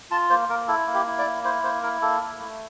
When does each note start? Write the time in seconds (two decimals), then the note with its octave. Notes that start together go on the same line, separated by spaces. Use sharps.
0.11 F4 A5
0.30 A#3 C5
0.49 A#3 A#4
0.68 E4 A4
0.87 A#3
0.94 G4
1.07 E4
1.19 D5
1.26 A#3
1.44 E4 C5
1.63 A#3 C5
1.83 E4 A#4
2.01 A#3 A4
2.21 E4
2.40 A3